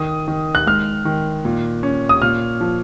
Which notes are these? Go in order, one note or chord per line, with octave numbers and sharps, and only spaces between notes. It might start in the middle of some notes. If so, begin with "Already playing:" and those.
Already playing: D#3 D#6
D#3
F#6
G#3 F6
D#3
A#2
C#4
D#6
A#2 F6
F3